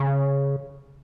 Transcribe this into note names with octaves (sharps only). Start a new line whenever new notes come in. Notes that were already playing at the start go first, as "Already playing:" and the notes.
Already playing: C#3